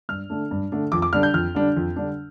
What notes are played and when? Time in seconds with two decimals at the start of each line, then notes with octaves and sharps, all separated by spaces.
0.09 G2 F6
0.30 D3 A3 D4
0.51 G2
0.72 D3 A3 D4
0.92 F2 D6
1.02 D6
1.13 D3 G3 D4 F6
1.23 G6
1.34 F2 F6
1.55 D3 G3 D4
1.77 F2
1.96 D3 G3 D4